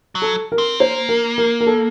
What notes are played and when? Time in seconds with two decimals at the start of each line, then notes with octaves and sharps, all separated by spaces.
0.15 F#3
0.22 A4
0.52 A#4
0.58 C4
0.80 A#3 C5
1.09 A#4
1.38 A#4
1.61 A#4
1.67 A4